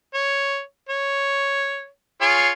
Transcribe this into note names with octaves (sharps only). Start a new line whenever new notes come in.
C#5
C#5
F4 G#4 C#5